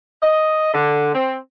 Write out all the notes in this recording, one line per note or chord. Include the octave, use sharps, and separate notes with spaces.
D#5
D3
C4